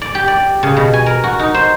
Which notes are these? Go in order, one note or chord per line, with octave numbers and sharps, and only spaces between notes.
D5
G4
D5
C#3
B2
G#5
A#4
F#4
D#4
C5